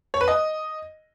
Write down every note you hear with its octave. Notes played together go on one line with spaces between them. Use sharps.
C#5
B4
D#5